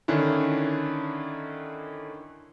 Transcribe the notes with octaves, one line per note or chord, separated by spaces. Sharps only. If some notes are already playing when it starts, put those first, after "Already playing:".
D3 D#3 C#4 D4 E4